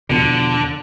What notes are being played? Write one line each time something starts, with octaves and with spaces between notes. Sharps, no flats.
E2 B2 D3 F3